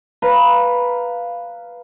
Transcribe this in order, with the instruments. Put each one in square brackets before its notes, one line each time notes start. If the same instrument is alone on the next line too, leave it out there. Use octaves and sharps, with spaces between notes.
[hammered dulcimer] B4 F5 A#5